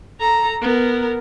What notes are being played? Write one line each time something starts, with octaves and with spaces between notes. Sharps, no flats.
A4 A#5
B3 A#4